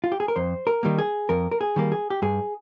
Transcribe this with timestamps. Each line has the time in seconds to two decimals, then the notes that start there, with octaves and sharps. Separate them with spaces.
0.04 F4
0.12 G4
0.20 G#4
0.28 A#4
0.36 F2 C5
0.67 A#4
0.83 D#3 G3 A#3
0.98 G#4
1.29 F2 A#4
1.51 A#4
1.61 G#4
1.76 D#3 G3 A#3
1.92 G#4
2.10 G4
2.22 G2 G#4